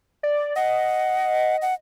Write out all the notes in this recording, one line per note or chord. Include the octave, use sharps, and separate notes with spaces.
D5
D#5 F#5
F#5